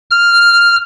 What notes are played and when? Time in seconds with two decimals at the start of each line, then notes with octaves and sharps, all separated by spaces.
0.11 F6